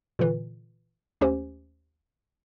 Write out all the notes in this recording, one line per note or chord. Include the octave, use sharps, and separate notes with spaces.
A#2 D3 E3
D#2 A3 C#4 G4 C5